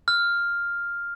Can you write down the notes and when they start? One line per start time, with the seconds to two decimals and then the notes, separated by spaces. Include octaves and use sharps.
0.08 F6